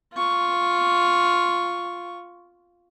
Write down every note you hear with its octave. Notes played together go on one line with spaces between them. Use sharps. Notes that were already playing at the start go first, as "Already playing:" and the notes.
F4 C#6